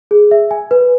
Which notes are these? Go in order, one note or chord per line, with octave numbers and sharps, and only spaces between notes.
G#4
E5
G#5
B4